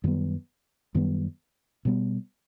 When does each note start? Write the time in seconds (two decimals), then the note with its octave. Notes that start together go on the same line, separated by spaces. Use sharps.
0.04 F#2 D#3 G3 B3
0.95 F#2 D#3 G3 B3
1.85 B2 G3 B3